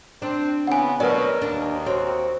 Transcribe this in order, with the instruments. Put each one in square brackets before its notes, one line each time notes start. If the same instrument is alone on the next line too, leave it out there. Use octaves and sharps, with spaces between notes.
[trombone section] C4 [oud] D4
[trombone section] C#3 E3 B3 [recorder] C4 [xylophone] F#5 G#5
[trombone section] D2 B2 [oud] F#3 [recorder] A#4 [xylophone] B4 D5
[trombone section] D#2 [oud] D4
[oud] C4 [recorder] F#4 [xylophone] C#5